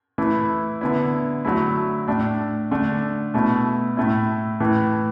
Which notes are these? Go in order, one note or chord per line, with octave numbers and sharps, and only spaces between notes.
E3 A3 E4
D3 B3 E4
D3 F#3 A3 E4
A2 A3 D4
D3 A3 D4
B2 A3 E4
A2 A3 E4
A2 E3 A3